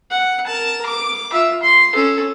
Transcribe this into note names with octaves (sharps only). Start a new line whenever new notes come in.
F#5
A#4 A5
D6
F4 E5
C6
C#4 A4